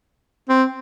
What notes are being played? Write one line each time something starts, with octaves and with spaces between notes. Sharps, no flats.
C4